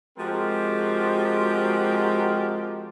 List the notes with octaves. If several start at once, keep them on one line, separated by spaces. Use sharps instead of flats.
F3 G#3 C4 F#4 G4 A#4